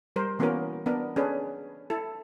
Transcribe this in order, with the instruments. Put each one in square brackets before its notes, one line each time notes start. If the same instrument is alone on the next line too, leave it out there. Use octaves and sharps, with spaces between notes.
[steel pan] G3 A#4 C5
E3 A#3 B3 C#4 F#4 A#4
B3 D4 A#4
C#4 D4 G#4 A4 B4
E4 A4